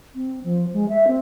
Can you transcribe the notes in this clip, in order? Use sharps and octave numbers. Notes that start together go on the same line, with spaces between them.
C4
F3
G#3
E5
C4